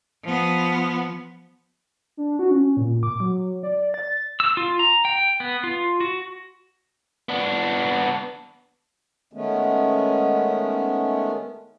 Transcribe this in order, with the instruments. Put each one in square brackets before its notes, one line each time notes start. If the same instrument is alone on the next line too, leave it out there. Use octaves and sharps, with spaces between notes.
[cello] F3 B3
[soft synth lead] D4
F#4
C#4
A#2
D6
F#3
D5
A6
[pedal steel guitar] E6
F4
A#5
G5
B3
F4
F#4
[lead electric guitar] B3 D4
[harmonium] D#3 G#3 A3 B3 C#4